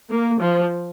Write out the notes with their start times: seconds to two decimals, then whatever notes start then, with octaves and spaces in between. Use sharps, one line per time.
0.10 A#3
0.40 F3